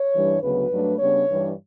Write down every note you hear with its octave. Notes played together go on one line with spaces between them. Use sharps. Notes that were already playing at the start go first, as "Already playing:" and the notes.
Already playing: C#5
G2 E3 G3 D4
D2 C#3 F#3 B3 B4
G2 F#3 A3 D4
C#3 G3 B3 D4 C#5
G2 E3 G3 D4